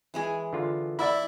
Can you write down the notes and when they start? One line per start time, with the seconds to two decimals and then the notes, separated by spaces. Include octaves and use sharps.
0.14 E3 G#3 G#4
0.53 D3 F4
0.99 E4 D5 E5 B5